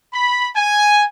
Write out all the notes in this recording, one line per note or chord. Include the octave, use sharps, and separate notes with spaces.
B5
G#5